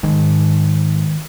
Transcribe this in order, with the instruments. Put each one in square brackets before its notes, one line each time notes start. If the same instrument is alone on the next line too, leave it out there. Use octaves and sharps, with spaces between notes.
[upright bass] G#2 [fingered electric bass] D#3 G#3